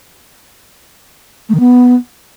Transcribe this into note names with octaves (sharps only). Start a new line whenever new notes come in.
A3
D#3
B3